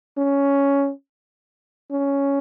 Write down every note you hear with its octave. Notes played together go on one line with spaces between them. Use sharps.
C#4
C#4